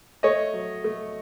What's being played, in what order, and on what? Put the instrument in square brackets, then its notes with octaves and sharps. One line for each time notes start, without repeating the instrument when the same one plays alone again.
[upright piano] A3 C#5 D#5
F#3
A3